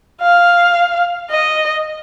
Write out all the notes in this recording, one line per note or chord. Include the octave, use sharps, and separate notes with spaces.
F5
D#5